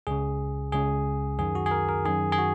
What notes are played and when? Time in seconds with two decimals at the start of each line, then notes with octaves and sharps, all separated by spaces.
0.07 C#2 C#3 G#4
0.72 C#2 C#3 G#4
1.39 F#2 D#3 G#4
1.55 F#4
1.66 G#4
1.71 A#4
1.89 A#4
2.05 F#2 D#3 G#4
2.32 G#4
2.38 F#4